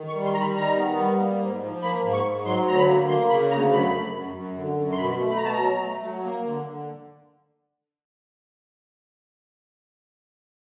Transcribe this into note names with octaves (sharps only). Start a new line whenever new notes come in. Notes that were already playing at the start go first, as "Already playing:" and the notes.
Already playing: D#3
C#6
G3
C6
G3 A#5
B5
D#3 A#5
B3
G3
A#3
G#2
F3
A#3 B5
G#2
C#6
G#2
F#3 C6
D2 A#5
B5
A#3
A#3 C6
C#3 B5
D2 A#5
F#2 B5
F#2
F#2
F#2
D3
F#2
C6
B2 B5
A3
B5
A#5
B2 A5
A#5
F#3
A3
F#3
A#3
D3
D3